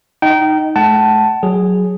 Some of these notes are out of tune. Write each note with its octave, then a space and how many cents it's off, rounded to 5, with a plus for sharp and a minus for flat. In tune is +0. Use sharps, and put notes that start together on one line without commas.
D#4 +0 G5 -25
A3 -45 F#5 +40 A5 +0
F#3 +0 G#4 +0